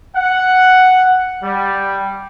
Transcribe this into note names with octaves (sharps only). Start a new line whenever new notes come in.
F#5
G3